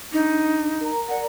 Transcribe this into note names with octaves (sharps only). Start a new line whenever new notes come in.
D4 D#4
A#4 A#5
A#4 D5 F#5 A#5